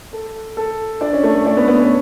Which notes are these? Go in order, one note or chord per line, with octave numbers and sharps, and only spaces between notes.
A4
A4
D4
C#4
A3
A3
D4
B3
B3
C#4